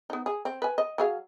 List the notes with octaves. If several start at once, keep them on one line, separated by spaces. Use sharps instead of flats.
B3 D#4
G#4
C4
B4 G#5
D#5
F#3 G#4 F5